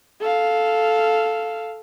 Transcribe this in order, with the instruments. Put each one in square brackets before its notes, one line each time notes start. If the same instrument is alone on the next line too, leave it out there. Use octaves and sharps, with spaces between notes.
[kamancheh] A4 F5